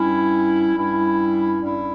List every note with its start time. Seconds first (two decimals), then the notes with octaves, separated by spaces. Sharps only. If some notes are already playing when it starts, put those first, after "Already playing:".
Already playing: G2 G3 C#4 E4
0.76 G2 G3 C#4 E4
1.61 G2 G3 C#4 E4